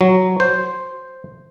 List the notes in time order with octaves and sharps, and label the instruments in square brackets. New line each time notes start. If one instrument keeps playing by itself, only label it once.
[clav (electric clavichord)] F#3
C5